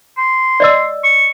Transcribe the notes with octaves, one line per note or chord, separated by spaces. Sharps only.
C6
D5 D#5 E6
C#6